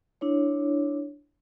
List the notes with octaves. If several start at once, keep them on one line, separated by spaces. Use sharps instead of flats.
D4 E4 C#5